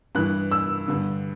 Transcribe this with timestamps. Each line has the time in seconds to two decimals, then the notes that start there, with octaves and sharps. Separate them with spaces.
0.15 G2 E3 F#6
0.52 E6
0.88 G2 D3